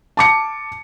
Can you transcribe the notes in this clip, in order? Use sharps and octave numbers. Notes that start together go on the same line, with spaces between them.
A5 D6 C#7